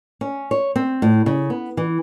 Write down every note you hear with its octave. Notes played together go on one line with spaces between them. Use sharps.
C#4
C#5
C4
A2
C#3
B3
E3